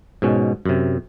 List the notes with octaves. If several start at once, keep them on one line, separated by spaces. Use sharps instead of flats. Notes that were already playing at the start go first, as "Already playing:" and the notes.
G#2 B2 C#4
F#2 C3